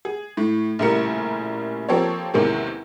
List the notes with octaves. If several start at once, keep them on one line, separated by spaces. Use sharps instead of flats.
G#4
A2
A#1 A2 C#3 G3 A#4 C#7
F3 A#3 C4 G4 A4 C#5
E2 C3 D#3 G#3 A#3 C#4